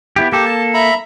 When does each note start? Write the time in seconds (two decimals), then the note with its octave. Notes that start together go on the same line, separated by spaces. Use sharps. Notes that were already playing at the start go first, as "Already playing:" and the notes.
0.16 B3 E4 G4
0.32 A#3 G4 A4
0.45 A5
0.74 E5 A#5 B5